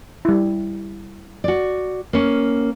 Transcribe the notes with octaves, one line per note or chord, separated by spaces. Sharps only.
G3 E4
F#4 D5
A#3 C#4